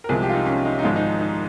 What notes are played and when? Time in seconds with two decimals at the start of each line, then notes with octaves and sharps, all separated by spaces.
0.04 A#4
0.09 C2 C3 F3 G#3 G#4
0.22 G4
0.29 F4
0.34 D#4
0.46 C#4
0.65 D#4
0.79 D#4
0.83 G#1 G#2 F3 G#3 F4
0.96 D#4
1.20 D#4